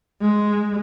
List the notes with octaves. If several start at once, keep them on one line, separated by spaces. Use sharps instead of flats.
G#3